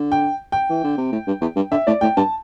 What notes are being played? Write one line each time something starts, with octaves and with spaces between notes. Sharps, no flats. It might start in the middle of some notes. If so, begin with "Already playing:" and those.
Already playing: D3
G5
G5
E3
D3
C3
A2
G2
E2
G2
D3 E5
A2 D5
A2 G5
G2 A5